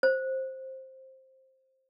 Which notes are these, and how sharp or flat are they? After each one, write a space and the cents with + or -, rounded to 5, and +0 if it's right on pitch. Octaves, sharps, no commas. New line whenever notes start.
C5 +10